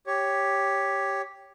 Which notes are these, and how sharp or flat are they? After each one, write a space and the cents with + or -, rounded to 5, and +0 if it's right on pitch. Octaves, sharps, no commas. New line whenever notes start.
G4 +0 C#5 +0